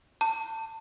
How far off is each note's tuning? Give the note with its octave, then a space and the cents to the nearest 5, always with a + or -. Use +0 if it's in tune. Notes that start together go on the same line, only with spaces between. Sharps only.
A5 +25